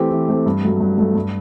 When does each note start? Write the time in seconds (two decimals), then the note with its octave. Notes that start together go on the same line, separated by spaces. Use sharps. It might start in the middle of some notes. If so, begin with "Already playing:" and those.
Already playing: E3 A3 C4 G4
0.11 E3
0.28 A3 C4 G4
0.46 G2
0.63 F#3 A3
0.81 G2
0.98 F#3 A3
1.15 G2